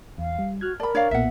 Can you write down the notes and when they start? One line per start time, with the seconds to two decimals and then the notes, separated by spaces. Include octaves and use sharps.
0.18 E2 F5
0.39 G3
0.61 F#4 F6 F#6 G#6
0.80 A#4 D5 A5 B5
0.95 D4 C#5 D5 F5
1.11 B1 A#2 B3 E5 F#5